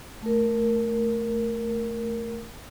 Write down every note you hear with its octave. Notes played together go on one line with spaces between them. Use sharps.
A3 A#4